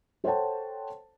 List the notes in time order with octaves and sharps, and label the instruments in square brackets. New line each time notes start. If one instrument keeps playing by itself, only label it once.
[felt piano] A4 C5 C#5 F#5 G5 A5